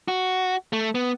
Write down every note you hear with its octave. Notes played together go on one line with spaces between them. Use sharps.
F#4
A3
B3